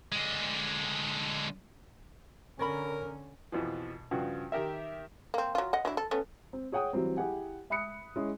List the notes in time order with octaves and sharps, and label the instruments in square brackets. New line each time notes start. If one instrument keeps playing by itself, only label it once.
[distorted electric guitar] D3 G#3
[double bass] D3 C#4 [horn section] A#4 [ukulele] C#5 B5
[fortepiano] F2 B2 E3 F3
G2 C#3 F3 F#4
D#3 G4 A#4 E5
[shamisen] A#3 C4
F#3 F4
D#5 F#5
F#3 D4 E4
A4
A3 B3 C#4
[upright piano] C4
G#4 C#5 F#5 G5 D#6
E3 F#3 G3 C4
E4 G4 G#4 F#5 G#5
E5 B5 D#6 F#6 C#7
G#3 C#4 E4 G#4